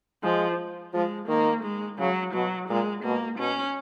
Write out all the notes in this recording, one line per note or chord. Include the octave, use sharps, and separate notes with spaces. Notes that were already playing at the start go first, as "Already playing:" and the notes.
F3 G#3
F3 G#3
D#3 A#3
G#3
C#3 F#3
B2 F#3
A#2 G#3
B2 A#3
B2 C#4